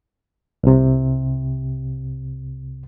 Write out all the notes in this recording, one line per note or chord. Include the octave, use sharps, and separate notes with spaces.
C2 C3